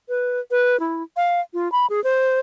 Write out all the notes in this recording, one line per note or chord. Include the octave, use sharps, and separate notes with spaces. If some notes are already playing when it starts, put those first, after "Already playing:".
B4
B4
E4
F5
F4
B5
G#4
C5